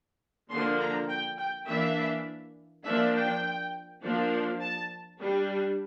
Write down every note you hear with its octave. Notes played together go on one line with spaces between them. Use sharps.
D3 F3 A#3 D4 C6
A#5
G5
G5
E3 A#3 D4 E5
F3 A#3 D4 E5
G5
F3 A#3 D4
A5
G3 D4